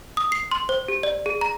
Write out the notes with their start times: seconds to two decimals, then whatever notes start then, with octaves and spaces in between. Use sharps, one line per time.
0.17 D#6
0.32 C7
0.51 C6
0.69 C5
0.88 G4
1.03 D5
1.26 G#4
1.41 A#5